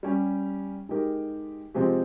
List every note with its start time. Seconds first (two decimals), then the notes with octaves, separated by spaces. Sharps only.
0.03 G3 C#4 G4
0.89 G#3 D#4 G4 A#4
1.74 C3 F3 G#3 C4 G4